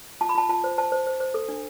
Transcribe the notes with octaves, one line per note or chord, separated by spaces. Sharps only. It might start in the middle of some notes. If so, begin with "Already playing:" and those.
F4 A5
B5
F4 A5
F4 A5
C5
C5 A5
C5
C5
C5
A4
D4